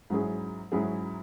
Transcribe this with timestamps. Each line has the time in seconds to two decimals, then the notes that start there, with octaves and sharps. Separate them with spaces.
0.10 G#2 F#3 C#4 E4 G#4
0.72 G#2 F#3 C#4 E4 G#4